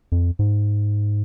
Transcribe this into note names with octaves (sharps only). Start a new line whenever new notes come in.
F2
G#2